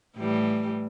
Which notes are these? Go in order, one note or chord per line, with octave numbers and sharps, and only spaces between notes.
A2 E3 G3